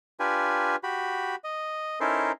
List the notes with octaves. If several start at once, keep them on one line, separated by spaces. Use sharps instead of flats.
D4 F4 G4 B4 G#5
F#4 G4 B5
D#5
C#4 D#4 E4 A4 A#4 C5